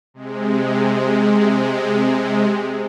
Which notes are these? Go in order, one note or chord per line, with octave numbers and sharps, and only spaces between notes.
C3 G#3